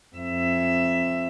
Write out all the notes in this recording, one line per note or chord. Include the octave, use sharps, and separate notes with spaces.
F2 E5